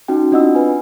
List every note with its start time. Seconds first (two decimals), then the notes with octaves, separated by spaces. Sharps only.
0.08 C#4 D#4 F#4 G5
0.32 C4 D4 F4 D#5 F#5 E6
0.55 B4 G#5